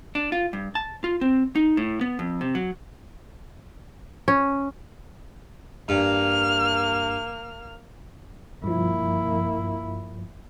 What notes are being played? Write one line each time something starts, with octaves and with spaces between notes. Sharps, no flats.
D4
F4
G2
A5
F4
C4
D#4
A2
B3
F2
C3
F#3
C#4
G2 A#3 F6
G2 F3 A#3 E4